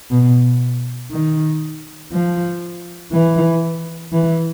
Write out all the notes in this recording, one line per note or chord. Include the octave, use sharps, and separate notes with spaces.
B2
D#3
F3
E3
E3